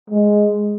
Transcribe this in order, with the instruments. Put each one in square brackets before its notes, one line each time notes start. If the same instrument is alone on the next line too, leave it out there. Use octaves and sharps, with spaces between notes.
[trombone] G#3